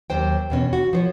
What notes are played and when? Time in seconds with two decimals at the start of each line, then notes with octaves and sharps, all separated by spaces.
0.10 D#2 F#3 C5 G5
0.50 E2 B2 C#4
0.73 F#4
0.93 F3 C5 C#5